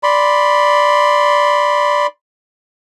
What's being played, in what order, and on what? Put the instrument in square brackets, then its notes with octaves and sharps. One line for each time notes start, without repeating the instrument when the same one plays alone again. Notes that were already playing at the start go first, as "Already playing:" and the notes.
[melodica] D5 B5 C6